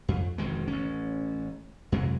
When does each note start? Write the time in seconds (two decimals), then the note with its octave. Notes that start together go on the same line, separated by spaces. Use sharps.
0.08 F2
0.38 E1 F2 D#3 G#3
0.68 A1 C#4
1.92 F2 C3 F#3 G#3